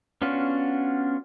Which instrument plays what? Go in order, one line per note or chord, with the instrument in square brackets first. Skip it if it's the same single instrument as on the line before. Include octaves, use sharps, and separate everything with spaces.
[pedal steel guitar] B3 C#4 D4 F4 F#4